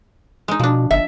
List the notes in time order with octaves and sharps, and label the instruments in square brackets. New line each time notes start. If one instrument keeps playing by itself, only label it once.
[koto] G#3 D#4
[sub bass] B2 [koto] F3 D4
[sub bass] G1 [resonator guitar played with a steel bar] E5